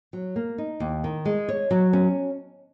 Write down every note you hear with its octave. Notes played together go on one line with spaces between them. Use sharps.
F#3
A#3
D#4
D#2
D#3
G#3
C#5
F#3
C#4